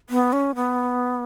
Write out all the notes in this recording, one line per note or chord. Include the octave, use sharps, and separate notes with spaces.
B3
C#4
B3